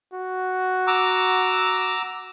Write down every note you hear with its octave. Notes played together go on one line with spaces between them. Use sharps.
F#4
A#5 D6 E6